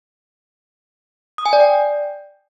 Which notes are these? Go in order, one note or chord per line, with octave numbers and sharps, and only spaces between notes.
D#6
G#5
D5
G5